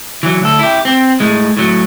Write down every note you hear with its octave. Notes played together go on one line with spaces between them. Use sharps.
E3 F#3
D2 A4
E4 G4
C4
A2 G#3
A2 F#3